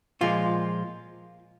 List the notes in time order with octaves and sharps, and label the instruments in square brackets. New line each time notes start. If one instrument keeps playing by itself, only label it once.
[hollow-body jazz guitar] A#2 F3 G#3 F4